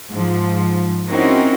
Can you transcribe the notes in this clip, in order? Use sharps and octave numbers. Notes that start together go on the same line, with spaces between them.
G#2 F3
C4 C#4 D#4 E4 F#4 A#4